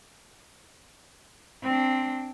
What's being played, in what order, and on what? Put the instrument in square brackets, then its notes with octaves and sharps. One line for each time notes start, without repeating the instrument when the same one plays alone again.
[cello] C4 D4